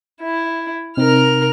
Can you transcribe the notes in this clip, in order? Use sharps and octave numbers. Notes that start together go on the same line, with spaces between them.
E4
C3 C4 D#4 A#4 F6